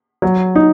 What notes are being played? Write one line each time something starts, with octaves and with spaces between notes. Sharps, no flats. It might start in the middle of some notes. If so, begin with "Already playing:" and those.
F#3
D#4